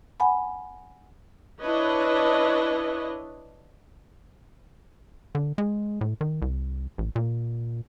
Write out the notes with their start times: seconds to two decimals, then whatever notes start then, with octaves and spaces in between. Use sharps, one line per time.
0.20 F#5 G#5 B5
1.62 D4 E4 B4 C#5 D#5
5.35 D3
5.58 G#3
6.01 A2
6.21 D#3
6.42 C2
6.98 A1
7.16 A#2